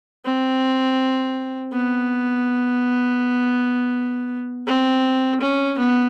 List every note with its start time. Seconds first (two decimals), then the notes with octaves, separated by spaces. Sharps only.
0.25 C4
1.73 B3
4.67 C4
5.41 C#4
5.78 B3